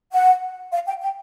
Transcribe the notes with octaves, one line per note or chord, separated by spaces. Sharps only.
F#5
F5
G5
G5